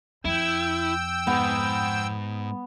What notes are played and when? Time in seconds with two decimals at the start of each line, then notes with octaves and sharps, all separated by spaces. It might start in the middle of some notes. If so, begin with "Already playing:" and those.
0.25 F2 E4 G5 E6
1.27 G#2 B3